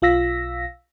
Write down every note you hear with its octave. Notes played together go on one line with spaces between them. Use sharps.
B1 F4 F5 E6 A#6 B6